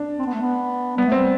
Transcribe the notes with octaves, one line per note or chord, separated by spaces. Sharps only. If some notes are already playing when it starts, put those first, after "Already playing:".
Already playing: D4
C4
B3
A3
B3
G3 B3
A3
C4
G3